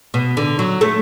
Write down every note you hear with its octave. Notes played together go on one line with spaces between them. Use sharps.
B2
D3
F#3
A3